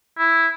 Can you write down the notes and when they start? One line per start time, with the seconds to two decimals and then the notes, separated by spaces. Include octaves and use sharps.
0.18 E4